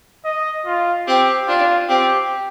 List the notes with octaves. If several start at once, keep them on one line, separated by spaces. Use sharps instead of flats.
D#5
F4
C4 G4
D4 F4
C4 G4